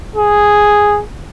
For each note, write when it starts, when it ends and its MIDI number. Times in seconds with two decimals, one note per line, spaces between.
0.16 1.00 68